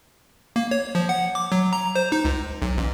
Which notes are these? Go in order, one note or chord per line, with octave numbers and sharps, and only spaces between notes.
A#3
C#5
F3
F#5
D6
F#3
A#5
C5
D#4
C#2
B1
A1